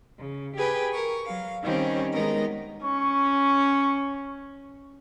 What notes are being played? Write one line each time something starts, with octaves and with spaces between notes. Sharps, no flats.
C#3
G4 G#4 B4 G5
A#4 C#6
F#3 F5
D#3 G3 C4 C#4
D#3 G#3 B3 D#4 A#4 A#5
C#4 C#6